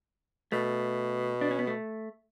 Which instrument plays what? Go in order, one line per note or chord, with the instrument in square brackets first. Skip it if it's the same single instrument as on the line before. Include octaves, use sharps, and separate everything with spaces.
[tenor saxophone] B2 [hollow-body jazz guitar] A3
[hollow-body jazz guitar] D4
C#4
B3
A3